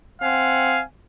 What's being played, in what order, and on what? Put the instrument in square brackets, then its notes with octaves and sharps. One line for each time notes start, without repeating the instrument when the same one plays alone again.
[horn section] C4 F5 F#5 G#5